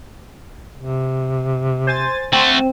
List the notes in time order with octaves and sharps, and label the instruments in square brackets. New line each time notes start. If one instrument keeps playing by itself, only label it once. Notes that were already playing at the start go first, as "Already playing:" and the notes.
[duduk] C3
[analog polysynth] C5 G#5 A6
[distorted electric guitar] A3 F#4 [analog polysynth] C4